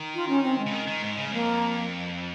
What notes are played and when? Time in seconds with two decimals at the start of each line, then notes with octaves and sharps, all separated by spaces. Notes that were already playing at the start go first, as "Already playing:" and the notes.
Already playing: D#3
0.14 F4
0.29 C#4
0.44 C4
0.58 G#3
0.66 C#3
0.73 D#3
0.87 D#3
1.02 G#2
1.17 C#3
1.31 F2 A#3